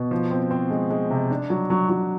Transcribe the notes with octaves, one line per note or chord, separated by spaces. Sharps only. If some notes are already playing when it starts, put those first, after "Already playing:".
Already playing: B2
F3
C4
C4
G#3
G#3
C3
D4
F#3
F#3
F#3